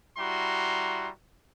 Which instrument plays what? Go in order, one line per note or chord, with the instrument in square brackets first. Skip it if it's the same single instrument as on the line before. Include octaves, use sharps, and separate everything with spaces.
[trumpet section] G3 E4 F#4 A#5 C6